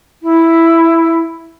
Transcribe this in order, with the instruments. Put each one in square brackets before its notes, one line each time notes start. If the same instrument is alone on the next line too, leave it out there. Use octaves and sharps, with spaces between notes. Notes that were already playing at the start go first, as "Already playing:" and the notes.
[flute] E4